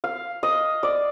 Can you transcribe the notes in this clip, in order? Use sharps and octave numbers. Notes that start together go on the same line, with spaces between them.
F5
D#5
D5